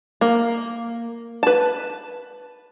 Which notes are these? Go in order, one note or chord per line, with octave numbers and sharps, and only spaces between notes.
A#3
B4 A5